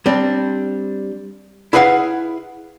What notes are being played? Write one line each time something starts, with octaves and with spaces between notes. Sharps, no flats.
G3 C4 D4
E4 G#4 B4 D#5 F5 F#5